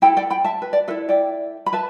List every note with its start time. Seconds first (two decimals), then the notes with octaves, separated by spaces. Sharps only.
0.02 E4 A4 G5 B5
0.17 D5 G5
0.30 G5 B5
0.44 E5 A5
0.62 B4
0.73 D5
0.88 E4 A4 B4 E5
1.09 D5 G5
1.66 B5
1.73 B4 E5 A5